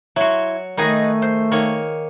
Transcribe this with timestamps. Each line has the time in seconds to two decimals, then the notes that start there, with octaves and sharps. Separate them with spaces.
0.16 F#3 E4 F#4 C6
0.77 D#3 A3 D#4 G#4 B4 D#5 C#6
1.22 C5
1.52 D#3 A#3 C#5